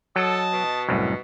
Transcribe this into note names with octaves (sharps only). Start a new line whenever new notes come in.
F#3 A4 D#5 A5
B2
C2 F#2 A2